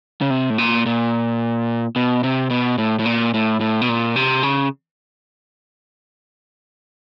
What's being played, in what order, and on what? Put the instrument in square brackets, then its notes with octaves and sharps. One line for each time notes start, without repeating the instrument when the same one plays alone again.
[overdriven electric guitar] C#3
C3
A2
A#2
A#2
B2
C3
B2
A2
A2
A#2
A2
A2
B2
A#2
C3
C#3